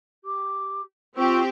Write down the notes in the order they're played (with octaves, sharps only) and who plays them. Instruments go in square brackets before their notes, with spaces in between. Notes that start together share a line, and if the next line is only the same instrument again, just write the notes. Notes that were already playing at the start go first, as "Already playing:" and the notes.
[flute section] G4 D6
[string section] C4 G4 [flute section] F4 C#6 E6